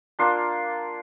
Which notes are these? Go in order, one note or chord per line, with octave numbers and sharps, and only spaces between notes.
A#3 D4 F4 C6